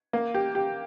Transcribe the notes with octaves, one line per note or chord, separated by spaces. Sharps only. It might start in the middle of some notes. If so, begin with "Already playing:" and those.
A#3
G4
G4